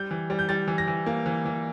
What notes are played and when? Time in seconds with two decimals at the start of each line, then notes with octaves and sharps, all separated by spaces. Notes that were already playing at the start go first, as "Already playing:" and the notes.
Already playing: G3 G6
0.11 E3
0.30 G3
0.39 G6
0.49 G3 A6
0.68 E3
0.78 A#6
0.87 E3
1.06 A#3
1.26 E3
1.45 E3